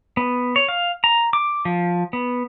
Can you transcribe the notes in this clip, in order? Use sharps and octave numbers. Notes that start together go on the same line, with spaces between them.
B3
C#5
F5
A#5
D6
F3
B3